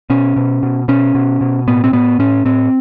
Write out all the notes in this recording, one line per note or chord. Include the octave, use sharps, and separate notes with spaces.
B2 C#4
B2
B2
B2 C#4
B2
B2
A2 B3
C4
A2 B3
A2 C#4
A2 C4